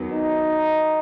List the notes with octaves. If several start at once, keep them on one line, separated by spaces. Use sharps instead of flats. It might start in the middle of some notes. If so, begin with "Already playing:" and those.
Already playing: E2 D#3 F#3 B3
D#4